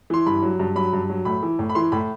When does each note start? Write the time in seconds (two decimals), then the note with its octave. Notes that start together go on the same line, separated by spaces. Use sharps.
0.10 E3 C6
0.27 G2 B5
0.42 F#3
0.60 G2
0.76 F#3 B5
0.93 G2
1.09 F#3
1.25 A2 B5
1.43 E3
1.59 A2
1.69 B5
1.75 E3 C6
1.92 A2 B5